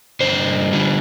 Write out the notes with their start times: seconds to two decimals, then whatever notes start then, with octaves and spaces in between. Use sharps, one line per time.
0.21 G2 D3 G3 C5
0.73 D3 G3